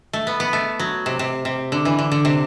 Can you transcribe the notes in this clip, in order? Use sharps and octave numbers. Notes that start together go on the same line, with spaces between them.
A3
B3
B3
A3
F#3
C3
C3
C3
D3
E3
D3
D3
C3